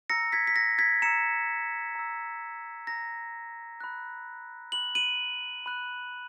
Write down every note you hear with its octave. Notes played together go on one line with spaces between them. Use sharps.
A#5 E6 A#6 C#7
G#6 B6
B6
A#6
G#6 B6
A#5 E6 C#7 E7
A#5 E6
A#5 E6 A#6
B5 F#6
B5 F#6 F#7
D#7 F#7
B5 F#6